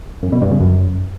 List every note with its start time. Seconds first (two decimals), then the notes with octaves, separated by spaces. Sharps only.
0.23 F#2
0.32 B2
0.42 G2
0.51 C#3
0.61 F#2